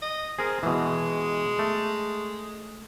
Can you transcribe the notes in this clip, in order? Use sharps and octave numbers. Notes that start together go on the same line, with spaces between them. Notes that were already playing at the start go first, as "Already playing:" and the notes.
D#5
C4 G#4 A#4
B2 E3 G#3
A3